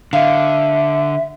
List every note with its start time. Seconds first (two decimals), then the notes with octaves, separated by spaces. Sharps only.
0.13 D3 E5 F5